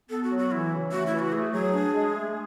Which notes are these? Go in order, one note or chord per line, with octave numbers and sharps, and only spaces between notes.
B3 A4
F#4
F#3
F#4
E3 E4
C#3
A3 F#4
E4
E3
F#4
A3 G#4
F#3 G#4
D4
G#3
A3